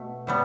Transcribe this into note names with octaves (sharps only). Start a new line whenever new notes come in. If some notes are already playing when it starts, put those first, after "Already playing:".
Already playing: B2 A3
A2 G3 B3